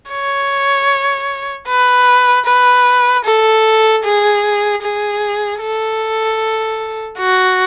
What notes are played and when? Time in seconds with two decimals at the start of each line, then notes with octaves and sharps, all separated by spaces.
0.11 C#5
1.68 B4
2.46 B4
3.24 A4
4.04 G#4
4.83 G#4
5.61 A4
7.19 F#4